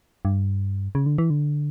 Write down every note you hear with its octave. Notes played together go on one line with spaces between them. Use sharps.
G2
C#3
D3
E3
D3